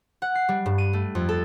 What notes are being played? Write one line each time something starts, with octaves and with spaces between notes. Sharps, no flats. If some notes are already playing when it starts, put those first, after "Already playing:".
F#5
C7
G3
G2
D#7
A3
F2
A4